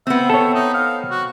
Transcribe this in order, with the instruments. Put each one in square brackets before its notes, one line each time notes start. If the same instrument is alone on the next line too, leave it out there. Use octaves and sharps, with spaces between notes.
[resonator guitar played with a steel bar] B3 C4 [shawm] E5
[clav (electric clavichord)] A4 C#5
[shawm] D#4
F5
F#4